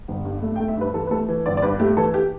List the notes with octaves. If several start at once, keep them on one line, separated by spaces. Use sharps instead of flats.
G1
G2
A3
G5
A3
E5
G2 B4
E3 A4
B4
A3 A4
E3
G1 D5
D5
G2 B4
A3 G4
E3 A4
G4